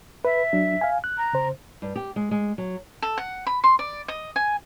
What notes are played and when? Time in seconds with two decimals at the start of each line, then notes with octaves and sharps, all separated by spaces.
0.25 B4 E5
0.53 F#3 D4
0.81 F5 G#5
1.04 F#6
1.18 A#5
1.33 C#3 C5
1.82 G2
1.96 G4
2.16 G#3
2.31 G#3
2.58 F#3
3.02 A4
3.18 F#5
3.47 B5
3.64 C6
3.79 D5
4.08 D#5
4.36 G#5